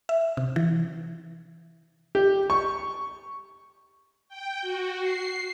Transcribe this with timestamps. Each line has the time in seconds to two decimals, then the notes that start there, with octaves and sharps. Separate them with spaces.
0.09 E5
0.37 C3
0.56 E3
2.15 G4
2.50 C#6
4.29 G5
4.62 F#4
5.00 C7